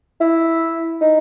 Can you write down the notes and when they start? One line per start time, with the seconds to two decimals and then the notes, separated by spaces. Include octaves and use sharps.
0.21 E4
1.01 D#4